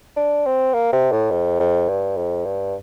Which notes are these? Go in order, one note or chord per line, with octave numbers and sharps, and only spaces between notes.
D4
C4
A#3
C3
A2
F2
F2
G2
F2
G2